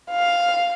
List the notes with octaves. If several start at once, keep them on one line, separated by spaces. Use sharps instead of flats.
F5